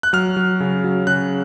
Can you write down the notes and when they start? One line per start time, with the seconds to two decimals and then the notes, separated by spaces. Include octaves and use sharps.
0.03 F#6
0.13 F#3 F6
0.37 F#3
0.60 C#3
0.84 F#3
1.07 C#3 F#6